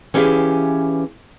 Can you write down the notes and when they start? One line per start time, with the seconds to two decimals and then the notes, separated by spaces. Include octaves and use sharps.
0.14 E3 C#4 G4 G#4 E5 F5